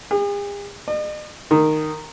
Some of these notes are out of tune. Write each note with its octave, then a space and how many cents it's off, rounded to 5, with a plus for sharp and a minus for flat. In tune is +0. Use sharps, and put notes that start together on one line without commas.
G#4 -45
D#5 -45
D#3 -5